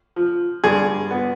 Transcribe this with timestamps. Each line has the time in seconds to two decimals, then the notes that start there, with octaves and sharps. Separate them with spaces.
0.16 F3
0.64 G2 G#4
1.11 B3